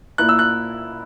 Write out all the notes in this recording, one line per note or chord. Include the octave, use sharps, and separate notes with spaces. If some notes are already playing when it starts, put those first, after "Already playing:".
A#2 A#3 E4 F#6
E6
F#6